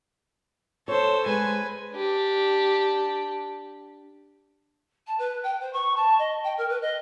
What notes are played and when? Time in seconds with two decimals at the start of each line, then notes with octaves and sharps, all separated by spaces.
0.88 A4 C5 C#5
1.26 G#3 B4 G#5
1.95 D4 G4
5.07 A5
5.18 B4
5.43 G5
5.61 C5
5.73 C#6
5.96 A5
6.18 D#5
6.43 G5
6.58 A#4
6.69 B4
6.81 D#5